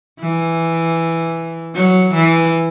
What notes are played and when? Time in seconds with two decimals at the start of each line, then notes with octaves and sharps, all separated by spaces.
0.20 E3
1.75 F#3
2.14 E3